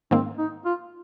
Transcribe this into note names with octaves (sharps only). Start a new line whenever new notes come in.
G#2 D#3 A#3 C4
D#4
F4